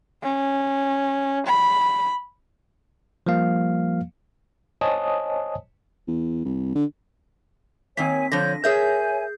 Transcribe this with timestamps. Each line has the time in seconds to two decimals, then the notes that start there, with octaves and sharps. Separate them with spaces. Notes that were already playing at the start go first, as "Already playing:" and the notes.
0.23 C#4
1.46 B5
3.26 F3 G3 A#3 F5
4.81 C5 C#5 D#5 G#5 A5 D#6
6.08 E2
6.45 C2
6.75 D3
7.97 D#3 A#3 C4 C#5 G#5 B6
8.32 D3 F3 C#5 G6 A#6
8.64 G#4 A#4 C#5 E5 G#5 G6